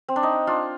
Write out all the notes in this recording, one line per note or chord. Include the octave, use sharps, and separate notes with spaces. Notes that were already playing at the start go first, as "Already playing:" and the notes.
C4
D4
D#4
D4 F4